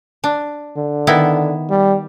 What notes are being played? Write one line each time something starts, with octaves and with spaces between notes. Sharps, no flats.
D4
D3
D#3 B3 E4
G3